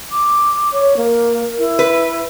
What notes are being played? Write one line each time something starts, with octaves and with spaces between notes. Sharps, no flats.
D6
C#5
A#3 A#4
E4
B4